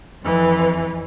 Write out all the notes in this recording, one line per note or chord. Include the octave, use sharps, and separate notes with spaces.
F2 E3